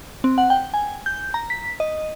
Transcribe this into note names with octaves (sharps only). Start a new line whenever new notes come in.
C4
F#5
G5
G#5
G6
A#5
B6
D#5